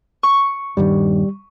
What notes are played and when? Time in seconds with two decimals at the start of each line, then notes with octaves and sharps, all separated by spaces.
0.23 C#6
0.77 D#1 G2 D#3 G3